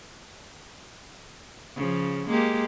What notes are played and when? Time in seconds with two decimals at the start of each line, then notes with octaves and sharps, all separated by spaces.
1.75 C#3 F3
2.27 G#3 A#3 G4